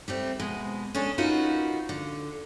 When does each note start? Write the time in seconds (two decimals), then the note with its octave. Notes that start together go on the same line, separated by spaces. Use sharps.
0.08 G3 A3 C4
0.39 B2 G#3
0.95 C#4 D4 G#4 A4
1.18 C#4 D#4 F4 F#4 A#4 B4
1.89 D3